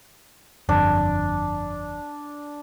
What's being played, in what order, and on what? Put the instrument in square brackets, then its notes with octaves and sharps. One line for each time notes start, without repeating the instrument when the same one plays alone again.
[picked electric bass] G1 F2 [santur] D4